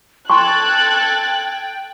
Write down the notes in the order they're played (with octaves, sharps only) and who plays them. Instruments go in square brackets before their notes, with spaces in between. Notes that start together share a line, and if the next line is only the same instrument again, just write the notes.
[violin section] A4 G#6 A6 [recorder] G5 [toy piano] A#5 C6 C#6 [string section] F#6